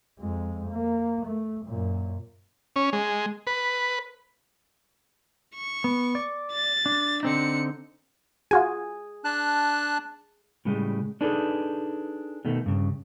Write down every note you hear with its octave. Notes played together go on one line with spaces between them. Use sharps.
F2 G#3
A#3
A3
F#2 A#2
C#4
G#3
B4
C#6
B3
D5
A6
D4
D3 C4 D4 D#4 C#7
F4 F#4 G#4 G#5
D4 A5 F#6
A2 C#3 G3 G#3
D4 D#4 G#4 A4 B4
B2 D#3 A3
G2 C#3